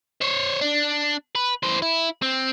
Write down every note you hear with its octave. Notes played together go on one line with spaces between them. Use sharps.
C5 C#5
D4
B4
E3 C5
E4
C4